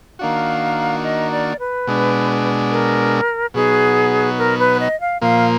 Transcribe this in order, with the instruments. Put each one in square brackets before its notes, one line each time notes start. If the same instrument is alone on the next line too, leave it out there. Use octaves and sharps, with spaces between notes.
[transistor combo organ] D#3 A#3 D4 F#4 [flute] F5
[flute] D#5
D5
B4
[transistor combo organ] B2 G#3 D4
[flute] A#4
[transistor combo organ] B2 F#3 B3 D#4 [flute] G#4
[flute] A#4
B4
D#5
F5
[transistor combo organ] A#2 F3 A#3 [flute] F5